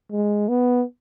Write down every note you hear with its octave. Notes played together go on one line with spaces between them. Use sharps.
G#3
B3